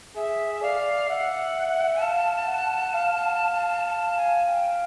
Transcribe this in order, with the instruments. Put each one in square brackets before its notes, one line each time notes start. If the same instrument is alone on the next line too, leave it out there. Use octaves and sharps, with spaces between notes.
[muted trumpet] G#4 [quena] E5
[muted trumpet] D5 [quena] F5
[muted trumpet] E5 [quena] F#5
[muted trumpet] F5 [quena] A5
[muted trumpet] F#5
F5
[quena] A5
G#5
G5